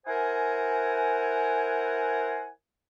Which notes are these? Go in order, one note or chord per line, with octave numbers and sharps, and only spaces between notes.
E4 A#4 C5 F#5 G#5